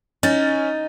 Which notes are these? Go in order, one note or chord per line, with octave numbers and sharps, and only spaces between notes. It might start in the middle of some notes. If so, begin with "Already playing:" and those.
C#4 D#4 A6